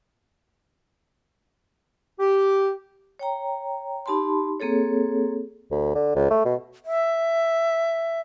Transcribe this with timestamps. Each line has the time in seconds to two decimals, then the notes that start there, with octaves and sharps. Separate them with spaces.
2.19 G4
3.19 C#5 G5 A#5
4.06 D#4 G4 A5 B5 C6
4.60 A#3 C4 G#4 A4 C#5
5.71 D2
5.95 D3
6.15 C#2
6.30 A3
6.45 B2
6.86 E5